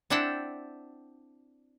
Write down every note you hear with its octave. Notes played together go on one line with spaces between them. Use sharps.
C4 D4 E4 F#5 G5 A5